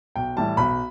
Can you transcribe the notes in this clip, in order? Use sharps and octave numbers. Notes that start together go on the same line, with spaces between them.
B1 G5
A2 E3 G3 A5
B1 B5